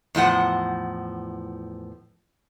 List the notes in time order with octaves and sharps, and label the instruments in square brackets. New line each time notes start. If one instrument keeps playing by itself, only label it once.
[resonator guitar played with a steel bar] E2 A2 F3 F#5